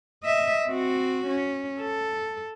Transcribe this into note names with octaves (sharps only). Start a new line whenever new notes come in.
D#5 E5
C4 F#4
C#4
A4